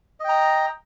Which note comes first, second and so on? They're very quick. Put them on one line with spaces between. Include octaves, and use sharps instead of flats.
D#5 G5 A#5